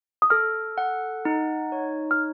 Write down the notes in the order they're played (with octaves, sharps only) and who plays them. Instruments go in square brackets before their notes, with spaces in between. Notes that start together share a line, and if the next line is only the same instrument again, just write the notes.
[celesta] D#6
[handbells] A4 [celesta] F6
[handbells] F#5
D#4
C#5
[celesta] F6